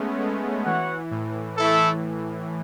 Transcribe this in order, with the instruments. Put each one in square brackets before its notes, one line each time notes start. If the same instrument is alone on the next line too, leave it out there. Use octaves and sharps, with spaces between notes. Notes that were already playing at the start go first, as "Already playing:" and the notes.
Already playing: [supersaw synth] G#3 A3 B3 C#4
G#3
[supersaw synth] E3 [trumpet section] F#4 C#5 F#5
[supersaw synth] A2
[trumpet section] A3 E4 A4